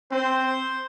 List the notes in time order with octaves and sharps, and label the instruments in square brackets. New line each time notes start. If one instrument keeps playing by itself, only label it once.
[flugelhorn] C4 [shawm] C5